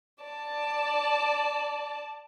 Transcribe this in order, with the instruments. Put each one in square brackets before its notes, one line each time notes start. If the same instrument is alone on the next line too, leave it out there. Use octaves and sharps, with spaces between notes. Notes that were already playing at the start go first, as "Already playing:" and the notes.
[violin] D5 A5